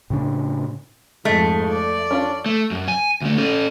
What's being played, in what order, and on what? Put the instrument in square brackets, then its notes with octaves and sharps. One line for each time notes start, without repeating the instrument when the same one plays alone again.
[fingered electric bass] A2 C#3 D4
[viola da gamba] F2 G#2 [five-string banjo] G#3 [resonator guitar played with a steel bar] A3
[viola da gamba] D5
[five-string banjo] C#4 D4 F4
[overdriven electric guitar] A3
F#2
G#5
D2 A3
C#4 A4